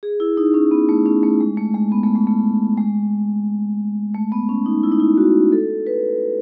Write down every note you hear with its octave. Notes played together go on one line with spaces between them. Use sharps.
G#4
E4
D#4
C#4
B3
A3
C#4
A3
G#3
A3
G#3
B3
A3
G#3
A3
G#3
A3
B3
C#4
D#4
E4
D#4
E4
F#4
A4
B4